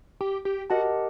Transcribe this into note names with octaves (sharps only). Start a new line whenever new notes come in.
G4
G4
F#4 G4 A#4 D#5 F#5 A5